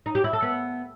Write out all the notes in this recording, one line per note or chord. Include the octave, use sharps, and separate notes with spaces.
D#4
G4
E4
A4
B3